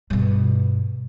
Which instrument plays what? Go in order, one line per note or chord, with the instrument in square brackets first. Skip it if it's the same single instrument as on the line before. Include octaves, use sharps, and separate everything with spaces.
[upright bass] G2 B2